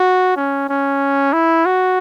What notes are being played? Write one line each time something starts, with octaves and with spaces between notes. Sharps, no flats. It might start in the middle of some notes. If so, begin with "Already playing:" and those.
Already playing: F#4
C#4
C#4
E4
F#4